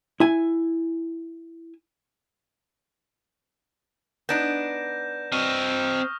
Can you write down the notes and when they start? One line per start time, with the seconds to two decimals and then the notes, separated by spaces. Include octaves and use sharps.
0.20 E4 G#5
4.29 B3 D4 D#4 G6 A#6 E7
5.32 C4 D#5 C#6 D#6 F6